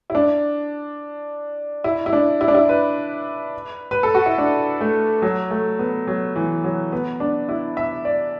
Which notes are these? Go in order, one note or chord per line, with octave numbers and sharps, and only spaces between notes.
E4
D4
E4
E4
D4
E4
D4
E4
B4
B4
A4
F#4
E4
D4
A3
F#3
A3
B3
F#3
E3
F#3
B3
D4
E4
E5
D5